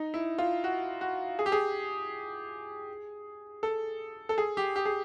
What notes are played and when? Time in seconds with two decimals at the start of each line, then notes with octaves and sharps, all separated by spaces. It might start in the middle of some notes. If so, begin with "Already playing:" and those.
Already playing: D#4
0.14 E4
0.38 F4
0.64 F#4
1.01 F#4
1.39 G#4
1.46 G4
1.52 G#4
3.63 A4
4.29 A4
4.38 G#4
4.57 G4
4.76 G4
4.85 G#4